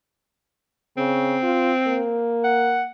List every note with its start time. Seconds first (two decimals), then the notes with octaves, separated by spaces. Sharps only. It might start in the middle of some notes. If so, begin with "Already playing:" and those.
0.97 C#3 C4
1.43 F4
1.87 A#3
2.44 F#5